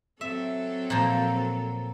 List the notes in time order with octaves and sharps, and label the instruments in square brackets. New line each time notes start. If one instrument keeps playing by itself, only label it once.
[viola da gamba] F#3 C4 A4 [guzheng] E5
[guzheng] A#2 F3